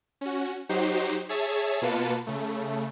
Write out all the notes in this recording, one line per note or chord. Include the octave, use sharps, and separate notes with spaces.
C#4 F#4
F#3 D#4 F#4 G4 C5 C7
G#4 C#5 E5 A5
B2 A#3 F4 B4 A5 C#7
C#3 A3